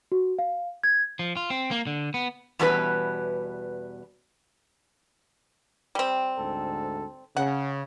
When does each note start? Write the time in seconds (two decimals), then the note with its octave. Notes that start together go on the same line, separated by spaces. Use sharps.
0.12 F#4
0.39 F5
0.84 G#6
1.19 F3
1.37 F4
1.50 C4
1.71 A#3
1.87 D3
2.14 B3
2.59 E2 B2 G3 C#4 E4 B4
5.95 G3 C4
6.38 D2 G#2 A4
7.36 C#3 F#5